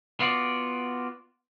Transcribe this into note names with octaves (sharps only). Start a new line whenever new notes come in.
B3 F4 F#4 D5